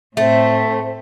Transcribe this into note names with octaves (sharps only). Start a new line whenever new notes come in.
A2 A3 C4 E5